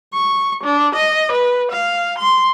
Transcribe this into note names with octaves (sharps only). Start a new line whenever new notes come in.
C#6
D4
D#5
B4
F5
C6